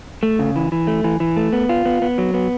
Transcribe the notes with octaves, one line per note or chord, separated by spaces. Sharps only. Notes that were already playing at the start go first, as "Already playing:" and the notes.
A3
C#3
E3
E3
A3
E3
E3
A3
B3
F4
B3
B3
F#3
B3